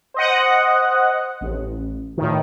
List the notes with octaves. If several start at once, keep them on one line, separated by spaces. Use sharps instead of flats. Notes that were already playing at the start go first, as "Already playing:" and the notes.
C5 D#5 F#5
A1
A2 D#3